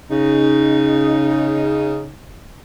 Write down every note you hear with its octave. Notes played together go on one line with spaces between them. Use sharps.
C#3 D#4